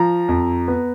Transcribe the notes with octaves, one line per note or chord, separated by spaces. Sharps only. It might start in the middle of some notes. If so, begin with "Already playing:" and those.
Already playing: F3 A#5
F2
B3